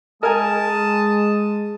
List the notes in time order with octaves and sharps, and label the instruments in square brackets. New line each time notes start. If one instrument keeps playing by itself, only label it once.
[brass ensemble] G#3 [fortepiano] A#4 G#5 [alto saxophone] A5 [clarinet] D#6